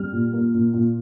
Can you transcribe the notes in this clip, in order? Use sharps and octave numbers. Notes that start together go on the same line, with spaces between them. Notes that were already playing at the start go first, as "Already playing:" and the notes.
Already playing: G3 F6
A#2
A#3
A#2
A#2